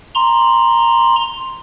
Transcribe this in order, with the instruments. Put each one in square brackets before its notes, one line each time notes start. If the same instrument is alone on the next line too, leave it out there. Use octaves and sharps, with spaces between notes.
[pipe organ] A#5 C6